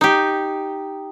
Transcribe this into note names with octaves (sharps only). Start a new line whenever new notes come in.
D#4 G4